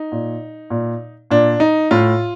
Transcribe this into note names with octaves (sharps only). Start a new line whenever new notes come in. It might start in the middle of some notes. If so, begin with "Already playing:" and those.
Already playing: D#4
A#2
A#2
A#2 D4
D#4
A2 F4